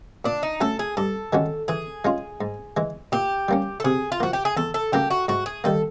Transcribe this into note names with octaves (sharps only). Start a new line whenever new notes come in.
A#2 D4
D#4
F#3 A3 C#4 A4
G#4
G2 A4
D#3 G#3 C#4 F#4
E3 G#4
G#3 C#4 F4
G#2
E3 G#3
A#2 G4
G3 A#3 C#4
A4
C3 G#4
F4
F3 A#3 F#4
G4
G#4
E2 A4
A4
C#3 F#3 A#3 G4
F#4
G#2 F#4
G#4
D#3 G3 A#3 A4